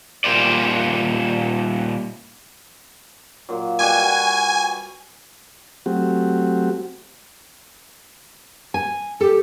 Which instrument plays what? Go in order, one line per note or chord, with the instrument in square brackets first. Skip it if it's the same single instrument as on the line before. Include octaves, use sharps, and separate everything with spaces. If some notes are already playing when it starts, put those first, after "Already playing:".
[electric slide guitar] A#2 G3 A#3 C5 D5
[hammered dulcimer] A#2 F#3
[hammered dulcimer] G3 F#4 B4 [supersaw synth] G#5
[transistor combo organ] F#3 A3 C4 F#4 G4
[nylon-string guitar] G#5
[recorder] G4 [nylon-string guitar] A4